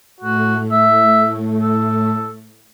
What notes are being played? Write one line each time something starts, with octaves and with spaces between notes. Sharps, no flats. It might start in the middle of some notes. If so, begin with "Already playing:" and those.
A2 A3 F#4
E5
A4